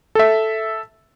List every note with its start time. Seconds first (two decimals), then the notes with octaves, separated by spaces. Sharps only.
0.15 A4 E5